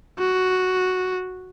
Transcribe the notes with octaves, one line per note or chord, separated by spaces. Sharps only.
F#4